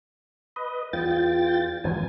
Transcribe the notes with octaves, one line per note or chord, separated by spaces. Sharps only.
B4 D#5
E2 F4 G5 A6
G#1 F2 E3 G#5